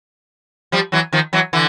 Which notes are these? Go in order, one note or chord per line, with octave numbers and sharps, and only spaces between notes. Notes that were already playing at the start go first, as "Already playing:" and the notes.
F3 G3
E3 F#3
D#3 F3
E3 F#3
D3 E3